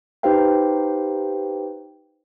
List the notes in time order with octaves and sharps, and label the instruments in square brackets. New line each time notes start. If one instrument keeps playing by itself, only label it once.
[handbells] D#4 G4 B4 C5 F5 G5